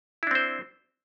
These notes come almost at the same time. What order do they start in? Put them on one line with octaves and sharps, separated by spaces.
E4 D4 C4 C5